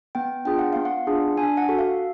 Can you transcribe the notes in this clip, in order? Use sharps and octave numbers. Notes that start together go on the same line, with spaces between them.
B3 G5
D4 F4 G#4 G5
F#5
B3 F5
F#5
D4 F4 G#4
D4 G#5
F#5
F#4 A4
F5